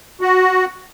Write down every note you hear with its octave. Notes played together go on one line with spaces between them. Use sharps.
F#4